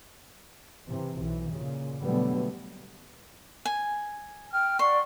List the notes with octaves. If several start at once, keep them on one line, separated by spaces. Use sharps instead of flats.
C3 E3
B1 E3
A#2 C#3
B2 D3 F#3 G3 A3 B3
G#5
G5 F6
D5 F#5 C6 C#6